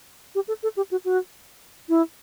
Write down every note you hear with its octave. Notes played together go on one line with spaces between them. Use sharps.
G4
A4
A4
G4
F#4
F#4
E4